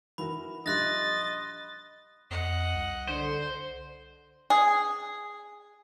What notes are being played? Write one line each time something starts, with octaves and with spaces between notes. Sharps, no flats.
E3 F#4 A#4 B5
A#1 G3 D#5 E5 C6 F#6 A6 A#6
F2 D#5 F#5
C2
D3 C5
G#4